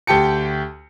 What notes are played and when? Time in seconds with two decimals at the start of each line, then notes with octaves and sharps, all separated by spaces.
0.07 D2 G4 G5 A5 C#7